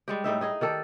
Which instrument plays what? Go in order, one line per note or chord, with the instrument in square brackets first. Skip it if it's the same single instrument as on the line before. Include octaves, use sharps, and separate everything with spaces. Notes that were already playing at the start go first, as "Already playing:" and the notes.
[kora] G3 G#3 G4
A2 G3 D#4 E5
D#4 G#4 D#5
D#3 G4 A4 D5